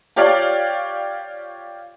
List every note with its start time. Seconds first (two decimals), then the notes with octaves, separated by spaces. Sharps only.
0.16 F4 G4 C#5 D5 F5 G5